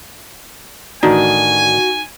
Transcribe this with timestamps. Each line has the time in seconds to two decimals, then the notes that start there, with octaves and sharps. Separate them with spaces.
1.03 A1 D#3 D4 D#4 F#4 G#5